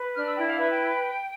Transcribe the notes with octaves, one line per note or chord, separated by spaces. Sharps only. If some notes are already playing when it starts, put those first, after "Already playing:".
Already playing: B4
D4 F6
E6
E4 G5
F5
B4 E5
G5